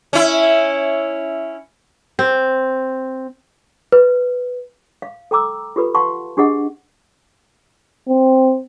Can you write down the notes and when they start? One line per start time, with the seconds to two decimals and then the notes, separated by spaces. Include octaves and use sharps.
0.13 C#4 E4
2.19 C4
3.92 B4
5.02 F5
5.31 A4 G5 A#5 D6 E6
5.76 F4 G4 A4 B4 B5
5.95 F5 F#5 A5 C6 C#6
6.37 D4 G4 G#4 D#5 F#5
8.09 C4